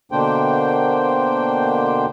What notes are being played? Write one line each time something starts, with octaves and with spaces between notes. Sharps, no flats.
B2 D3 A#3 D4 C5 G5